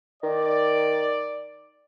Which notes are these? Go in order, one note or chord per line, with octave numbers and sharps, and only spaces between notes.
D#3 D5